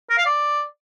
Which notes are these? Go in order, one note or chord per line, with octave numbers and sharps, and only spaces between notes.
A#4
F5
D5